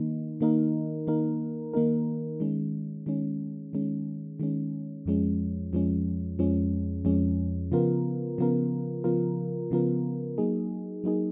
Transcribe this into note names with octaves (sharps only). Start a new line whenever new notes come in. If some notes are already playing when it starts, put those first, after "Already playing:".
Already playing: D#3 A#3 D#4
D#3 A#3 D#4 A#4
D#3 A#3 D#4 A#4
D#3 A#3 D#4 A#4
D#3 G#3 C#4
D#3 G#3 C#4
D#3 G#3 C#4
D#3 G#3 C#4
F2 F3 G#3 C#4
F2 F3 G#3 C#4
F2 F3 G#3 C#4
F2 F3 G#3 C#4
C#3 F3 B3 F4 A#4
C#3 F3 B3 F4 A#4
C#3 F3 B3 F4 A#4
C#3 F3 B3 F4 A#4
F#3 A#3 D#4 G#4
F#3 A#3 D#4 G#4